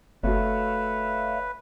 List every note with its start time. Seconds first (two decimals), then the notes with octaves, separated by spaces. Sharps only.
0.23 F#1 A3 F#4 B4 C#5 E5 F5